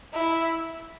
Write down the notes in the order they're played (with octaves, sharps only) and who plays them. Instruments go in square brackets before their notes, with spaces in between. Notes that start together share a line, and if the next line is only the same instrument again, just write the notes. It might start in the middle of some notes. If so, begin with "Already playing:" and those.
[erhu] E4